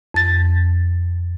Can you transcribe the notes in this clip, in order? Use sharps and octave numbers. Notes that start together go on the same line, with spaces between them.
F2 A6